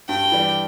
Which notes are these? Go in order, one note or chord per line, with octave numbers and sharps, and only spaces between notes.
G2 G5
E3 G3 D4